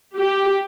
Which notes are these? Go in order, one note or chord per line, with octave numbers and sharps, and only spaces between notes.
G4